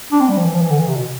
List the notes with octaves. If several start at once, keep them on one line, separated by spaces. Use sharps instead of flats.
D4
C4
G3
F3
E3
F3
E3
D3
E3
C3
B2